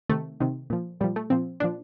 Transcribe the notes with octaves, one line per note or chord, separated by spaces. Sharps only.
C3 D#3 A3
C3 D#3
A#2 F3
A#2 F3 G3
A3
A#2 F3 C4
A#2 F3 D4